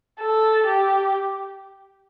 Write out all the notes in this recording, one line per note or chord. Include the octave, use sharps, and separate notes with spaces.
A4
G4